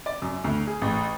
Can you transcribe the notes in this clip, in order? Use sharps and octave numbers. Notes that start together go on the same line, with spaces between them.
D5
F#2
D2
G#4
A1